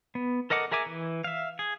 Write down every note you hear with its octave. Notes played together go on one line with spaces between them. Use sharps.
B3
A4 A#4 D#5 F#5 D6
G#4 A#4 E5 G#5 D6
E3
E5 F5
G#4